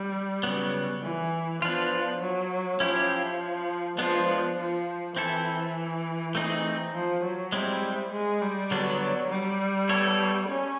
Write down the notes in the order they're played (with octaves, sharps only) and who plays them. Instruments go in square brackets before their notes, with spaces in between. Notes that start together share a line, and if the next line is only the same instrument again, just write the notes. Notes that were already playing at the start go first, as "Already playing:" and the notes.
Already playing: [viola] G3
[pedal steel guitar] C#3 F#3 B3
[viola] E3
[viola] F3 [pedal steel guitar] B3 D4 F4
[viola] F#3
[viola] F3 [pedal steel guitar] C#4 E4 G4
[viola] F3 [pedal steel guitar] G#3 B3 D4 F4
[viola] F3
F3
[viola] E3 [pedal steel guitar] C4 E4 A4
[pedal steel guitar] A3 C4 D#4 G#4
[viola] F3
F#3
[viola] G3 [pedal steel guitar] G#3 C4 E4
[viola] G#3
G3
[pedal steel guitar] D3 G3 B3 D4 [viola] F#3
[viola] G3
[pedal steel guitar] B3 E4 A4 C#5
[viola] C#4